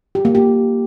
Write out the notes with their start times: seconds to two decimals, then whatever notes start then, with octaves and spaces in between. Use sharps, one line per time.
0.15 G4
0.25 A#3
0.35 G4